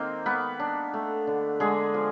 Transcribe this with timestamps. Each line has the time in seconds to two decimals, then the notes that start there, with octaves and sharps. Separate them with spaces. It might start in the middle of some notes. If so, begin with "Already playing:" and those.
Already playing: D#3 A#3 C4 C5
0.26 A#3 B3 B4
0.60 D4
0.93 A3
1.27 D3
1.60 D3 G#3 G#4
1.94 F3